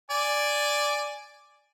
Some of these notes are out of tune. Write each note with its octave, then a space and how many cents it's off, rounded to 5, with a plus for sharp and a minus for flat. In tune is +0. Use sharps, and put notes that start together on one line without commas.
D5 +0 G#5 +0